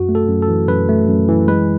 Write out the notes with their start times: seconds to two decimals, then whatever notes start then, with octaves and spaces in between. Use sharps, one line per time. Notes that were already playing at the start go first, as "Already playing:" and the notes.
Already playing: F#2 F#4
0.09 A3
0.15 A4
0.28 F#2
0.42 A4
0.48 E3
0.68 F#2 B4
0.89 A3
1.09 F#2
1.28 E3
1.48 G#3 B4